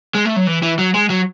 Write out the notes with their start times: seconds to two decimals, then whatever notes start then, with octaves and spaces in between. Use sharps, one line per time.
0.15 G#3
0.25 A3
0.36 F#3
0.47 E3
0.62 E3
0.78 F#3
0.94 G#3
1.10 F#3